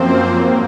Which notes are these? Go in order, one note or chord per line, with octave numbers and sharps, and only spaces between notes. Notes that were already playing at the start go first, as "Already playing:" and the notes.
Already playing: F#2 F3 A#3 C4 C5
G#2 F#3 A#3